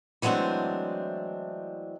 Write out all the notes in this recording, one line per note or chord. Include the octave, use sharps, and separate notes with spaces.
E3 F#3 G#3 A3 C4 D4